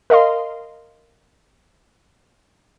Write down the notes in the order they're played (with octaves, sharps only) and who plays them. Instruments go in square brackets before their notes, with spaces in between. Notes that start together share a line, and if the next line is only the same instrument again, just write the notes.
[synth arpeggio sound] A#4 D#5 F5 C6